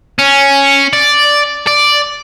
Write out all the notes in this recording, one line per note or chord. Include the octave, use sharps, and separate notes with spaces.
C#4
D5
D5